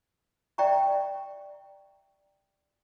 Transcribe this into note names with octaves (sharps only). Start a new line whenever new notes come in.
D5 E5 G5 A#5 C#6